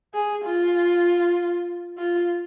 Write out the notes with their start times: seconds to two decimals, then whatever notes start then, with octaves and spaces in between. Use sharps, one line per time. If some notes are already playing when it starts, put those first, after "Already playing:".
0.14 G#4
0.44 F4
1.98 F4